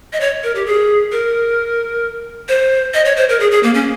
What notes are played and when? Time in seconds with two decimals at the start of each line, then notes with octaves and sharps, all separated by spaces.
0.13 D#5
0.20 C#5
0.44 A#4
0.55 G4
0.66 G#4
1.12 A#4
2.48 C5
2.94 D#5
3.05 C#5
3.17 C5
3.29 A#4
3.40 G#4
3.51 G#4
3.63 A#3
3.74 C#4